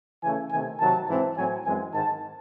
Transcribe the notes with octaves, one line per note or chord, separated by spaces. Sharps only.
C#3 E3 A3 C#4 G#5
C3 D#3 A3 C4 G#5
C3 D#3 F#3 A5
G#2 E3 C4
A2 F#3 C4 G#5
F#2 E3 G#3 C4 G#5
G#2 D#3 G#3 A5